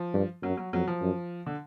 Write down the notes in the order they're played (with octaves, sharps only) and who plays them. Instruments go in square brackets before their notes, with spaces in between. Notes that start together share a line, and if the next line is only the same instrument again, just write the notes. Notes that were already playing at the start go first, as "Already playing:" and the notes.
Already playing: [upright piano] F3
[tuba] G2
[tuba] F#2 [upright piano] F#3
[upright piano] F#3
[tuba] F2 [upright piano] F#3
[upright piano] F3
[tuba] F#2
[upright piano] D3